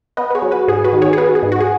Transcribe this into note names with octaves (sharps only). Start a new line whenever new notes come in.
B3 B4 D#5
B4
G#4 C#5
F#3
F#4 B4
G#2 G#4
F#4 B4
D#3
G#4 C#5
G#4
B3 F#4 B4
G#4
G#2
F#4
G#4